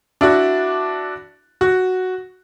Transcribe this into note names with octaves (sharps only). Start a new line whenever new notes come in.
D4 E4 F#4
F#4